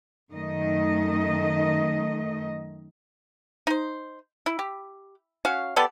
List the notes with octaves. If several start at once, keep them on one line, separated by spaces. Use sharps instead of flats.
F#2 D#3 A3 D#5
D#4 C5
E4
G4
C#4 F#4 F5
B3 G4 A4 D5